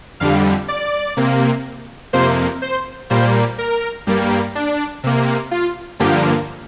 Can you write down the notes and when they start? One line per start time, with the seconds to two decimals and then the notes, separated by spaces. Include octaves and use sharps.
0.20 F2 D3 G3 F5
0.68 D5
1.17 C3 A#3
2.13 F2 C3 A#3 C5
2.62 C5
3.10 A#2 G3 A#3 C5
3.58 A#4
4.07 G2 G3 A#3
4.55 D4
5.04 C3 A#3
5.51 F4
6.00 G2 D3 F3 A#3 G4